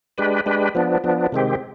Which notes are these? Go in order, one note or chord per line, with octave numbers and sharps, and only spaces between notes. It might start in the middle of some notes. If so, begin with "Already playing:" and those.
G#3 D4 G4 B4
G#3 D4 G4 B4
F3 B3 D4
F3 B3 D4
C3 D#3 G#3 C4 G4